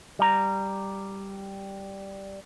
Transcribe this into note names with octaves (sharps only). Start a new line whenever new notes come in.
G3 A#5